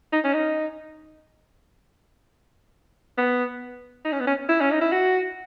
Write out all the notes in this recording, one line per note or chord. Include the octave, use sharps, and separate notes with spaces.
D#4
C#4
D#4
B3
D#4
C#4
B3
C#4
E4
C#4
D#4
E4
F#4